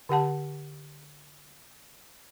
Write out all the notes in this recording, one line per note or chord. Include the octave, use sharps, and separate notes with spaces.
D3 G4 F#5 A5